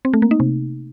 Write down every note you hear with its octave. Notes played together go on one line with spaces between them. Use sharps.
C4
A3
A#3
D#4
C3